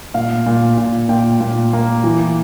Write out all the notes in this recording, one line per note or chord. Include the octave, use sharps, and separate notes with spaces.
A#2 F5
A#2
A#2
A#2 G5
A#2
A#3
E3